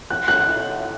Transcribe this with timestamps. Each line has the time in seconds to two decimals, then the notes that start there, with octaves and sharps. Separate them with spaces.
0.10 F#6
0.28 F#6